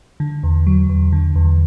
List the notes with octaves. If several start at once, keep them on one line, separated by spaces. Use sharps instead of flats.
D3
E2
F#3
E2
D3
E2